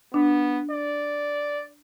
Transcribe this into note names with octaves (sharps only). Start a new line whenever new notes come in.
B3 D4
D5